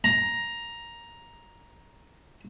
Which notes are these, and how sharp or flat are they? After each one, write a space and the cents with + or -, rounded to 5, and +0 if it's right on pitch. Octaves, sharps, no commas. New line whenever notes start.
A#5 +10